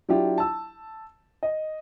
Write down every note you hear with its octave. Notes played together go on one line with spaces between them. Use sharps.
F#3 D4 E4 F4 G4
A5 E6
D#5